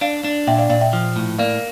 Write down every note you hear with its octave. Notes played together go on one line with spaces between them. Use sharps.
D4 D5 F5
D4
A#2 E5 G5
D5 F5
A#2 D5 F5
E5 G5
F3
A2
A#3 D5 F5